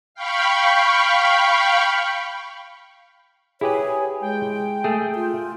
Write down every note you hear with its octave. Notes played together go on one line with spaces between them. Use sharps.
F5 G5 B5 C#6
E4 G4 G#4 B4 C#5
G#3 G5
A3 G#4
F4